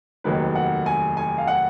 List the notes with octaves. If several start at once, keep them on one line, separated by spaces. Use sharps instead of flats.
F1 D#2 D#3 F#3 B4
F#5
G#5
G#5
F5
F#5